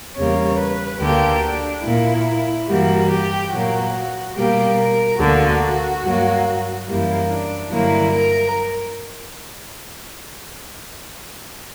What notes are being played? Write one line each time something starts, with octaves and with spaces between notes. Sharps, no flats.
E2 C#3 G3 A#3 C#5
B4
D2 D3 A#3 G4
D4
A#2 A#3 E4
G2 E3 G3 A#3 F#4
G4
A#2 F#3 A#3 F#4
B2 G3 A#3 G4
A#4
D2 D3 A#3 F#4
G2 F#3 A#3
F#2 E3 G3 A#3 E4
D4
G2 D3 F#3 A#3 E4
A#4